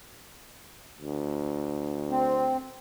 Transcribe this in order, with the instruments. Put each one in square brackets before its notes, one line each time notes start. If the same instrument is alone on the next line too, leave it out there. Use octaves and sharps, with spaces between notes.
[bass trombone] D2
[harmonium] C4